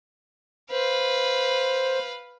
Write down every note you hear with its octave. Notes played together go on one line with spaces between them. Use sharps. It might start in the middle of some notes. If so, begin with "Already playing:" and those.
B4 C5 F5